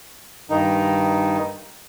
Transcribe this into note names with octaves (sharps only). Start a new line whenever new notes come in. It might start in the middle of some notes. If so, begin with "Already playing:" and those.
G2 D#3 D#4